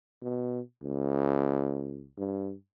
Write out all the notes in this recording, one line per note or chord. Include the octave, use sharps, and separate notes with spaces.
B2
C#2
G2